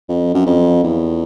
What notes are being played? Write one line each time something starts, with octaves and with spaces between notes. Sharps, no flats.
F2
F#2
F2
E2